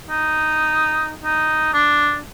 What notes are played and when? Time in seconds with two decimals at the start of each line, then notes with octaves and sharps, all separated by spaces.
0.10 D#4
1.24 D#4
1.73 D4